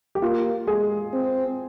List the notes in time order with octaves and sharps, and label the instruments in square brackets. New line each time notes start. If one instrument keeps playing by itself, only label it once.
[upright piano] G4
[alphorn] A#3 [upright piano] F4
[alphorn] G#3 [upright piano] G#4
[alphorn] C4